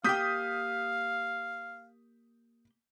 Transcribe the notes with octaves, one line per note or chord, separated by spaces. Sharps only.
A#3 G4 F5 G5 D#6 G6 B6